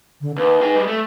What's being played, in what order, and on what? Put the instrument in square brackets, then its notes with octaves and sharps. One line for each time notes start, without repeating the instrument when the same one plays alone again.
[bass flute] D3
[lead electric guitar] D#2 [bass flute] B4
[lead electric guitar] D#4 G#4
G3 G#3
A3